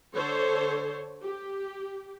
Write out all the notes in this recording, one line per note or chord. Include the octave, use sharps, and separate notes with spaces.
D3 A4 C5 C#5
G4